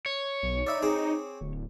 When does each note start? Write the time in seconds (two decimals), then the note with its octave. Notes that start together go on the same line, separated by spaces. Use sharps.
0.06 C#5
0.43 B1
0.67 D#4 D5 E5 B5
0.82 C4 G#4 D6
1.41 D1